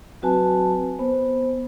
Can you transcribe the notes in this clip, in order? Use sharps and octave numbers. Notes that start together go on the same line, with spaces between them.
F#3 C4 F#4 B4 G#5 A5
B3 C5